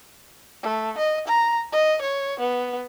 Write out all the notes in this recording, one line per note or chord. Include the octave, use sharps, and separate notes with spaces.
A3
D#5
A#5
D#5
C#5
B3